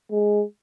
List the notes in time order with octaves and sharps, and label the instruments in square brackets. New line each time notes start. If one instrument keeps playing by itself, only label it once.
[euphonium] G#3